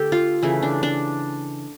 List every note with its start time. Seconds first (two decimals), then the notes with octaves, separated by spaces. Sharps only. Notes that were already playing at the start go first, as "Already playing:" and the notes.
Already playing: D3 A3 G4 A4
0.12 F4
0.43 C#3 E3 A3
0.63 D4
0.83 D4